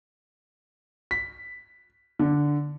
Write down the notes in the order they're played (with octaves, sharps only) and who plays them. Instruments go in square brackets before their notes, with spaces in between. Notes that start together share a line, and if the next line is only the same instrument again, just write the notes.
[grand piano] B6
D3